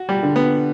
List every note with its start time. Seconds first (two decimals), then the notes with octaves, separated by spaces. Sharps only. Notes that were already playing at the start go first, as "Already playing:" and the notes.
Already playing: F#4
0.09 G3
0.23 D3
0.36 B3